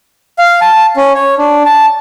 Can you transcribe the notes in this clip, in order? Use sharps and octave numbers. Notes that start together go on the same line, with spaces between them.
F5
A5
C#4
C#5
D4
A5